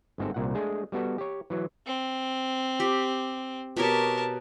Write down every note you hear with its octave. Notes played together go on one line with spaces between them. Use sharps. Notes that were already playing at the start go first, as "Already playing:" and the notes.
G1 G#2 C4 A4
C2 A#2 F#5
G#3 A3 D4 G#4
G3 B3 F#4 A4
G4 C#5
E3 F#3
C4
G4
B2 G4 A#4 C#5 A5